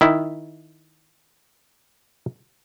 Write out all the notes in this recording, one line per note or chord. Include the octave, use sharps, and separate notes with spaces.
D#3 E4